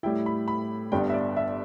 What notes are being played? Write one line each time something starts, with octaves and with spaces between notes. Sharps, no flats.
A2 G3 E4 G5
B5
B5
G1 G2 G3 B3 G5
E5
D5
E5